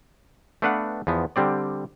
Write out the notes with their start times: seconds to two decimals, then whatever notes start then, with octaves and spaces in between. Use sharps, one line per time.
0.62 A3 B3 D4 B4 F5 F#5
1.07 E2 F3 B3
1.36 D3 G3 C4 D5